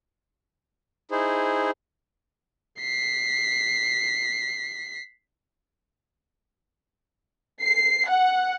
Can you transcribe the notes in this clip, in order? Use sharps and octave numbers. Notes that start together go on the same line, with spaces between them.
D#4 E4 G#4 C5
B6 C7
C7
F#5